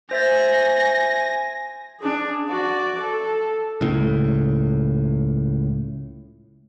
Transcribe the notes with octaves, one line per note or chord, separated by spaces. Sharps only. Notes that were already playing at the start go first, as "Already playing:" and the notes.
C5 E5 G#5 A6 A#6
D4 G#4
F#4 D5
A4
C#2 A2